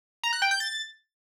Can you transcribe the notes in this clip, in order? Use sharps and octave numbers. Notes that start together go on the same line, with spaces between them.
A#5
F#6
G5
G6
A6